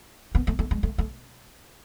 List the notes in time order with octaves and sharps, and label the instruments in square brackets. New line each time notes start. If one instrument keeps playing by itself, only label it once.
[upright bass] B3
A3
A3
G#3
A3
A3